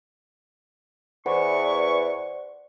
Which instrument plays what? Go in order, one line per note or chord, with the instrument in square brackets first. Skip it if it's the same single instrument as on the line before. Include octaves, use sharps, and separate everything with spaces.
[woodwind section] E2 E3 C#6 [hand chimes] C5 D5 F#5